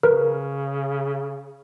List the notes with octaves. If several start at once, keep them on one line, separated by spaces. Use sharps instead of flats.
C#3 A#4 B4